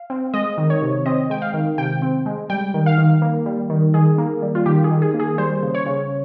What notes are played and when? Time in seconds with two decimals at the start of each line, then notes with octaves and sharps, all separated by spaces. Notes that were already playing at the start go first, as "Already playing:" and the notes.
Already playing: F5
0.10 C4
0.34 G#3 D#5
0.58 D#3
0.70 C#5
0.82 C3
1.06 C4 D#5
1.30 G#3 G5
1.42 F5
1.54 D#3
1.78 C3 G5
2.02 C4
2.26 G#3
2.50 G3 G5
2.74 D#3
2.86 F5
2.98 D#3
3.22 A#3
3.46 G3
3.70 D#3
3.94 D#3 G#4
4.18 A#3
4.42 G3
4.55 F4
4.66 D#3 G4
4.84 G#4
4.90 D#3
5.02 G#4
5.14 A#3
5.20 G#4
5.38 G3 C5
5.63 C#3
5.75 C#5
5.86 C#3